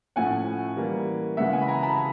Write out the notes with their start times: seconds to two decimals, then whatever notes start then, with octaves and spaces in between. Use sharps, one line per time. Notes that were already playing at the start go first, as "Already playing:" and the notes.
0.16 A2 F3 A3 C#4 F#5 G#5
0.77 E3 G3 A#3
1.37 C#3 E3 G#3 E5 F#5
1.53 F#5 G#5
1.62 B5
1.68 G#5 A#5
1.83 A5 B5